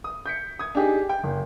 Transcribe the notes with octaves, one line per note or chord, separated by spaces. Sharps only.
D#6
G6 B6 C#7
D#6 G#6
D4 D#4 G4 G#4
G5
F#1